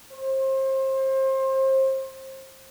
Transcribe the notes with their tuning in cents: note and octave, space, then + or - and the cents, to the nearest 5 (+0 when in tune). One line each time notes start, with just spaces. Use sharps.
C5 +30